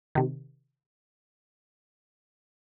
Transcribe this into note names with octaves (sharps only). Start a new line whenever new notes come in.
C3 D#3